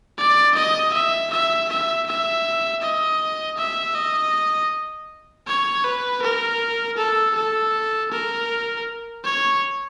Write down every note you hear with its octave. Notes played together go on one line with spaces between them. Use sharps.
D5
D#5
E5
E5
E5
E5
D#5
E5
D#5
C#5
B4
A#4
A4
A4
A#4
C#5